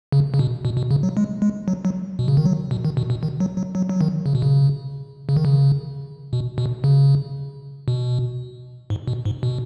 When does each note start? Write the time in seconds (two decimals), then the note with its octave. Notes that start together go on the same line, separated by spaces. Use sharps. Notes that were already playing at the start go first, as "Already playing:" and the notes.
0.12 C#3
0.34 C#3
0.39 B2
0.65 B2
0.77 B2
0.91 C#3
1.03 F#3
1.17 G#3
1.42 G#3
1.68 F#3
1.85 F#3
2.19 B2
2.28 C#3
2.37 D#3
2.45 F#3
2.71 B2
2.85 D#3
2.97 B2
3.10 B2
3.23 D#3
3.40 F#3
3.57 F#3
3.75 F#3
3.89 F#3
4.01 D#3
4.26 C#3
4.35 B2
4.42 C#3
5.29 C#3
5.37 D#3
5.45 C#3
6.33 B2
6.58 B2
6.84 C#3
7.88 B2
8.90 G#2
9.08 B2
9.25 G#2
9.43 B2